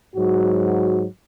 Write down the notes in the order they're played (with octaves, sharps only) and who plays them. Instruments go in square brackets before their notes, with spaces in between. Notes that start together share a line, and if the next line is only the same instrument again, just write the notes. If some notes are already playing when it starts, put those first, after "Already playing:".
[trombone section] G#2 F#3 F#4